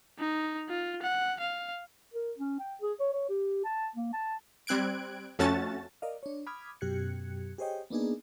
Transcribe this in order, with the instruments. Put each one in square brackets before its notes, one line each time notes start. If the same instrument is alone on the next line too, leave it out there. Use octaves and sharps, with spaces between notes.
[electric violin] D#4
F4
F#5
F5
[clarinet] A#4
C#4
G5
G#4
C#5
C#5
G4
A5
A#3
A5
[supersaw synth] G3 C4 F#6 G#6 D7
F2 A3 C#4 F#4 A5 A6
[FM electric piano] A#4 D5 D#5 F5
D4 C#5
B5 D6 D#6 F6 G#6
F#2 B2 G4 F#6 G#6 C#7
G4 G#4 C5 C#5 D#5 G5
A#3 B3 D4 D#4 G#4